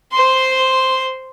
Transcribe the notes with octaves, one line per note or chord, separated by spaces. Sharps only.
C5 C6